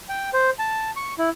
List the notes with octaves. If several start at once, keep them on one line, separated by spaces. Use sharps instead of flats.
G5
C5
A5
C#6
E4